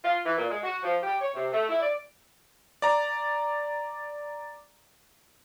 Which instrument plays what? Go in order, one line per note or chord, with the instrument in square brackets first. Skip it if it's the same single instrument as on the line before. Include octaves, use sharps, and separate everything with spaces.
[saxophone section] F4
E3
A#2
G#3
F#4
F3
G4
C#5
C3
A3
E4
D5
[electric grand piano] D5 A#5